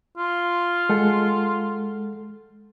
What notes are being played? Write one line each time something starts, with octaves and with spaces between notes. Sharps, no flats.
F4
G#3 A4 F#5